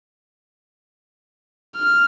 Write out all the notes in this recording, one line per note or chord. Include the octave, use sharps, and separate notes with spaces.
F6